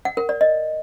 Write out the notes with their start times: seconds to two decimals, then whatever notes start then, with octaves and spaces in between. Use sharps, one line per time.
0.05 F#5
0.17 A#4
0.29 D5
0.41 D#5